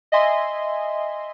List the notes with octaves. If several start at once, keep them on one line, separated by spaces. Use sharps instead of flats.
D#5 E5 G#5 C6